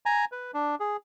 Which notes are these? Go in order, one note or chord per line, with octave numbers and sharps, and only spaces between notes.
G#5 A#5
B4
D4
G#4